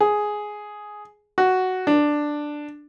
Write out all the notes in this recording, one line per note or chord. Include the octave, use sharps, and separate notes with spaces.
G#4
F#4
D4